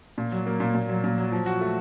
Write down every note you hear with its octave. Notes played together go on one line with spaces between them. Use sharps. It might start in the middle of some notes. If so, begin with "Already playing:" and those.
A#2
F#3
A#3
A#2
A#2
F#3
A#2
F#3
F3
F#4
A3